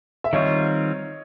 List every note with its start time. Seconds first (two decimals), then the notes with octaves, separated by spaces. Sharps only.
0.24 E5
0.33 D#3 G3 C4 F4 C#5 D#5